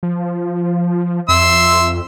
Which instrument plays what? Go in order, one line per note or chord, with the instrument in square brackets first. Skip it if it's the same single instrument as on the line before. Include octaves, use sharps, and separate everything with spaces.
[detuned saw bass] F3
[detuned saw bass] F2 [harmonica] E5 C6 E6